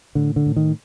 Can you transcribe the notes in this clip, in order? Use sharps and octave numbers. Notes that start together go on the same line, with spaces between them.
A2 D3
D3
A2
D#3